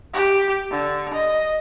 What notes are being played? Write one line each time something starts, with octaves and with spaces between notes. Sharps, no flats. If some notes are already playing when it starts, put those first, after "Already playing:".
G4
D3
D#5